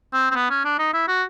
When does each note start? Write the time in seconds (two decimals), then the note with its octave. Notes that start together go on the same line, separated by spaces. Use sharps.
0.14 C4
0.31 C4
0.36 B3
0.50 C#4
0.65 D4
0.79 D#4
0.94 E4
1.08 F#4